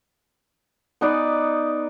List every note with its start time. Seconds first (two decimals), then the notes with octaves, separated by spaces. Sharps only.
1.01 B3 D#4 B4 D5